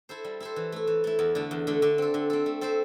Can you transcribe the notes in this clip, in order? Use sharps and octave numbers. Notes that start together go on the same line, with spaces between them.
E4 A4 C5
G3
E4 A4 C5
E3
A3 E4
E3
A3 E4
E2
D3 A3
E2
D3 A3
D3
C4 A4
D3
C4 A4
A3
C4 A4 C5 E5